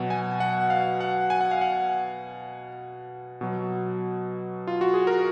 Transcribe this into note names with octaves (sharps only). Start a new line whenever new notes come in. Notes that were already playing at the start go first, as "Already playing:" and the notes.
Already playing: B2 F#3 F#5
G#5
F#5
F5
F#5
G#5
F#5
F5
F#5
B2 F#3
F4
F#4
G#4
A#4